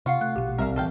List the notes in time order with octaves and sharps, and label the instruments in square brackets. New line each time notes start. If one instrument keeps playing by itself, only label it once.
[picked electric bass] C3 [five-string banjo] F4 [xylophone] F5 F#5 C#6
[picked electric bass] A3 [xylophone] F#6
[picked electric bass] A#1 B2 [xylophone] G4
[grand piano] C2 G3 [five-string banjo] A#4 E5 F5
[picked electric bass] A#1 E3 [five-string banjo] A4 F5 G5